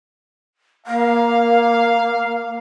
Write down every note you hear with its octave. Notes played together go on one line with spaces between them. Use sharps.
A#3 F5